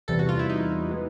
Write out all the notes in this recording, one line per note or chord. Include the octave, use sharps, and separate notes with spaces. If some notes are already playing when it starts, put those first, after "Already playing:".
E2 C3 E3 G3 A4
F#4
F4
E4
D#4
E3 G#3 B3